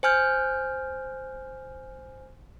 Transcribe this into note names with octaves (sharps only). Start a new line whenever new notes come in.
C5 G#5 F6 G6